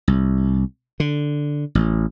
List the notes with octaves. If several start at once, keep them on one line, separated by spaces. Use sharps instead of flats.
C2
D3
A1